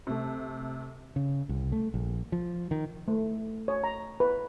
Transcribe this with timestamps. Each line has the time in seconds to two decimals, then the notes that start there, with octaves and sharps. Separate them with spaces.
0.07 C3 A3
1.16 C#3
1.49 C2
1.72 A3
1.94 A#1
2.32 F3
2.71 D#3
3.08 A3
3.68 C#5
3.84 A#5
4.20 B4